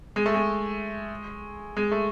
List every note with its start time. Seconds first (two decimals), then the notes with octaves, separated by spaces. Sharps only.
0.16 G#3
0.26 A3
0.34 G#3
1.77 G#3
1.92 A3